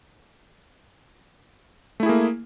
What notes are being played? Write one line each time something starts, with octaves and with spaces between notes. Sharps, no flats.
A3 A#3 E4 G#4